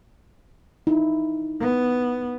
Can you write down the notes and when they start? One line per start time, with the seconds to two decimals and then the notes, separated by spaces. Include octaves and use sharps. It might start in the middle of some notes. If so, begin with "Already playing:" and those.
0.87 D#4 E4
1.60 B3